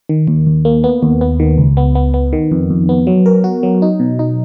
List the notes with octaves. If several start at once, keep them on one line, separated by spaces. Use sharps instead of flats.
D#3
D#2
D#2
A#3
B3
D#2
B3
D#3
C#2
B3
B3
B3
D#3
F2
F2
B3
F#3
A#4
F#4
F#3
D#4
B2
D#4